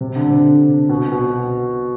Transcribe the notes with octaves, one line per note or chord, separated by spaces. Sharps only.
C3
D3
D3
C3
B2
B2